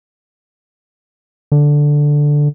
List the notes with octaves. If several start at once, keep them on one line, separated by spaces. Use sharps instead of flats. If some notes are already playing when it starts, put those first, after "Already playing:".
D3